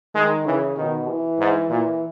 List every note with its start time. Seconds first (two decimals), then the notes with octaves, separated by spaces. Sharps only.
0.15 D#3 G#3
0.46 C#3 E3
0.77 B2 D#3
1.08 E3
1.39 G#2
1.70 A#2 E3